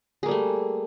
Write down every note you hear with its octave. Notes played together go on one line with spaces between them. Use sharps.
G3 A3 A#3 G#4